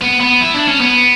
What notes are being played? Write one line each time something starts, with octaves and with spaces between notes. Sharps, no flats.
B3
B3
E4
D4
C#4
B3